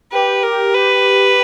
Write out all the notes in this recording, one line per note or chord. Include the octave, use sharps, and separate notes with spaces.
G4 B4
A#4
G4 B4